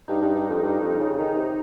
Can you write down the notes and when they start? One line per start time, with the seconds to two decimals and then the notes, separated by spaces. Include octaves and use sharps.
0.08 G2 D#4
0.22 G2
0.35 G2
0.49 F2
0.63 G2
0.80 F2
0.99 C#3
1.18 D#3 D#4
1.36 C3